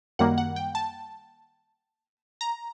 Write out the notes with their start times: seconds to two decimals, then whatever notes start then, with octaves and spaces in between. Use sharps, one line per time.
0.19 F#2 D#3 G3 A#3 F#5
0.38 F#5
0.56 G5
0.75 A5
2.41 A#5